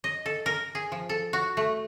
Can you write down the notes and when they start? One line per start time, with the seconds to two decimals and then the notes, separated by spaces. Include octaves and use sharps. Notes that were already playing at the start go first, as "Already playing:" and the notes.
0.04 D#5
0.26 A4
0.46 A#4
0.75 G#4
0.92 F3
1.09 A4
1.33 F#4
1.57 A3